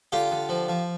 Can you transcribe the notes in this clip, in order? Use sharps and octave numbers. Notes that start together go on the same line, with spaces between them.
D3 F4 G4
D3
F3
F3